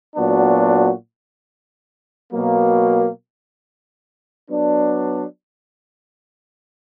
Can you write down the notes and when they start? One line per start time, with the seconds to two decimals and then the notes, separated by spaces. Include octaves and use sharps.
0.15 A#2 F#3 B3 D4 F#4
2.32 B2 F#3 A#3
4.48 F#3 B3 D4